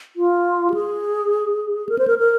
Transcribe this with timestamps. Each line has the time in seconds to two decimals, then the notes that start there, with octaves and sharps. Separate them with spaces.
0.16 F4
0.70 G4
0.74 G#4
1.89 A#4
1.99 C5
2.08 A#4
2.18 A#4